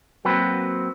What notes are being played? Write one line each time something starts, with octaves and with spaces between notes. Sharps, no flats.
F#3 A#3 C4 F#4 B4